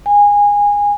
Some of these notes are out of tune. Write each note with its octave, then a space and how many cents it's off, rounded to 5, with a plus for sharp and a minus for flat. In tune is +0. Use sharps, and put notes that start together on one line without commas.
G#5 -20